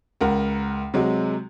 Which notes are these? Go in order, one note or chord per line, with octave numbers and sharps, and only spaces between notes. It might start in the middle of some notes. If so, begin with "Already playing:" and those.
C#2 A#4 F#5
C3 F#3 G#3